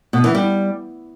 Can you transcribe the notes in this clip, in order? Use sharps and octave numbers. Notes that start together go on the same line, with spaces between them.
B2
E3
G3